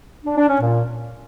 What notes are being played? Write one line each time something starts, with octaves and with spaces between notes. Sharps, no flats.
D4
D4
C#4
A#2